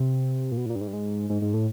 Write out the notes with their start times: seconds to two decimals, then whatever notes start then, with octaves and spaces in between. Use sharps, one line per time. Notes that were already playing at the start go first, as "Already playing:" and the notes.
Already playing: C3
0.52 A#2
0.57 B2
0.66 A2
0.70 A#2
0.75 G2
0.81 G#2
0.88 G2
0.93 G#2
1.30 G#2
1.42 G#2
1.54 A2